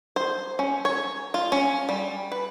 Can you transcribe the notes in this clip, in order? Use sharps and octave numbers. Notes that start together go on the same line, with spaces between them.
C5
C#4
C#5
F4
C#4
G3
B4